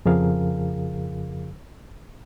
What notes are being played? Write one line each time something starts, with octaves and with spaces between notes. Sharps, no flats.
F2 C#3 F3 G#4 A#4 F5